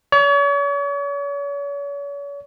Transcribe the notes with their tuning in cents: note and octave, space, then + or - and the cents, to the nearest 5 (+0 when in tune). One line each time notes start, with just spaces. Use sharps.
C#5 +40